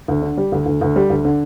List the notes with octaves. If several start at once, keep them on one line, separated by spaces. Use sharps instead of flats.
D2
D3
G3
D2
D2
D2
G3
D2
D3